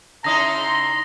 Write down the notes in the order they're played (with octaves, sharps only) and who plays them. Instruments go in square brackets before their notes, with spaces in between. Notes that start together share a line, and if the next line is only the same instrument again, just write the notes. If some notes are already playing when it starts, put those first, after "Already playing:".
[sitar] C#3 D#4 E4 [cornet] A#5 [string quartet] C6 [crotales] D#6 A#6